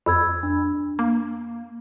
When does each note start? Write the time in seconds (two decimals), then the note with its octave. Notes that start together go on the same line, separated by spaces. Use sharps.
0.06 F2 B5 E6 G#6
0.43 D4
0.99 A#3